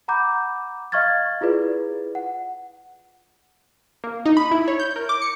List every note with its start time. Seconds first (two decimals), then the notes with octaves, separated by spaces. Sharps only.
0.08 F#5 A#5 B5 D6 G6
0.92 D#5 F5 C#6 F6 G#6 A6
1.41 E4 F4 G#4 B4 D5
2.15 F#5
4.04 A#3
4.26 D#4
4.37 B5
4.51 E4
4.68 C#5
4.80 G6
4.96 A#4
5.09 D6
5.22 C#7